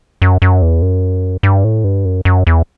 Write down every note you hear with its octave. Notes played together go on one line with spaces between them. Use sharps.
F#2
F#2
E2
F#2
G2
A2
G2
F#2
F#2
E2